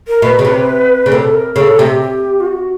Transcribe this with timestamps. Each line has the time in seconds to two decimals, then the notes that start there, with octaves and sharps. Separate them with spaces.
0.08 A#4
0.22 B2 B4
0.39 C#3
0.45 C3
1.06 C#3
1.12 C3 A4
1.34 A#4
1.56 C#3 A4
1.78 C3 G4
2.01 G4
2.40 F4
2.46 F#4